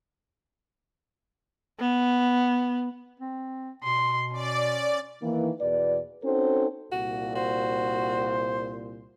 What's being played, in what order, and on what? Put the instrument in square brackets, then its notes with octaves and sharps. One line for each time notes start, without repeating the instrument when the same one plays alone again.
[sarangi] B3
[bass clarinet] C4
[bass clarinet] B2 [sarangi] C6
[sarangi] C#4 [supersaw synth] D5
[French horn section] D#3 E3 A#3
E2 B2 B4 D5
C4 C#4 D#4 F#4 A4 C5
[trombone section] C2 A#2 [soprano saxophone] F#4
[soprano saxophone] F#4 [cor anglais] C5